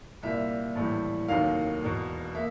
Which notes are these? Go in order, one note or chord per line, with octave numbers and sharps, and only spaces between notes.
C2 A#2 G3 A#3 E5
A#1 A2 E3 G3
F1 D#2 D#3 F#3 A#3 F5
E1 E2 B2
A#3 E5